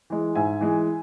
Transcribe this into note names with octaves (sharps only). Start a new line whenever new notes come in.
E3 G#3
G#2 E5 G#5
E3 G#3